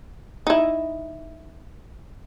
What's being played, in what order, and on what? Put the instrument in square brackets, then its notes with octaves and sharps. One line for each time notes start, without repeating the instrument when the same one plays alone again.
[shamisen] D#4 E4